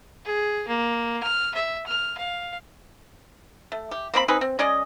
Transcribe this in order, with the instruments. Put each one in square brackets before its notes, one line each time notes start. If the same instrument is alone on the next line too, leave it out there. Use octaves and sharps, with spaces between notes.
[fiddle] G#4
A#3
F6
E5
F6
F5
[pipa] A3
G4
A#3 C4 G4 B5
C4 D#4 G#4 B4
C4
G#3 C#4 D5 D#5